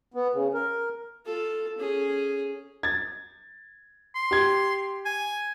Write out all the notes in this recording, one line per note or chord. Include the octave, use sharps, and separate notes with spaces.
B3
C#3
A#4
F4 A4
C#4 G#4
G#6 A6
C6
G4 G#6
G#5